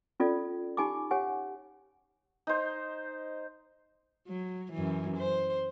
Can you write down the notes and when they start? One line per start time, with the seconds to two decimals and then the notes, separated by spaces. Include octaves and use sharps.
0.20 C#4 F4 A4 D5
0.77 D#4 G4 G#5 B5 D6
1.11 G4 C#5 F#5 G#5
2.47 D#4 C5
4.28 F#3
4.73 F#2 E3
5.17 C5